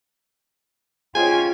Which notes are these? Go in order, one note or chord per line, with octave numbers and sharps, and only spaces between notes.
C#4 F4 G#4 C5 D#5 G5 G#5